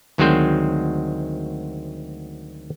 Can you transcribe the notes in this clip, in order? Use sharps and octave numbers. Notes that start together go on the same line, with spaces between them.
D2 D#3 F#3 G#3 C4 C5